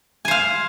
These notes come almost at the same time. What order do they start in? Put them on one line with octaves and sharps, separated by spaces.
G#5 C5 F5